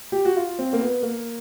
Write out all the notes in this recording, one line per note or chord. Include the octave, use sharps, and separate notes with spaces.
G4
F#4
F4
C4
A#3
B3
A#3